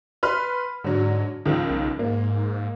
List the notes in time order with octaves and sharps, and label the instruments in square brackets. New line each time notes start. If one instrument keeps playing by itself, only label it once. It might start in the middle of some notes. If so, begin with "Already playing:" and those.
[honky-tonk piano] B4 C6 F6
[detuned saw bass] G#2 [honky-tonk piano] D3 F#3
[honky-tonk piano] C#2 D#3 F3 [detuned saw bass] G#2
[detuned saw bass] B1
[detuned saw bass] G#2 [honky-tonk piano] A#3